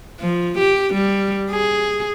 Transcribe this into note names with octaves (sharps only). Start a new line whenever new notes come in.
F3
G4
G3
G#4